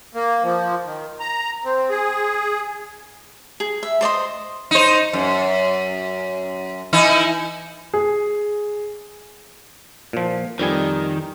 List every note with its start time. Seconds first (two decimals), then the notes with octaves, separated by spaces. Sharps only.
0.14 A#3
0.43 F3
0.85 D#3
1.20 A#5
1.65 C4
1.90 G#4
3.60 G#4
3.83 E5
4.01 C5 D5 D#5 C6
4.71 D#4 C5
5.13 F#2
6.93 E3 D#4 E4
7.94 G#4
10.13 A#2 F3
10.59 F2 D#3 G3 G#5